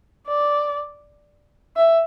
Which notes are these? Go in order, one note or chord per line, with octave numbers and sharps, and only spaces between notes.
D5
E5